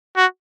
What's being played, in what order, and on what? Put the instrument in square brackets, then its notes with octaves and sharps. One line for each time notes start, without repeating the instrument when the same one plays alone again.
[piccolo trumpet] F#4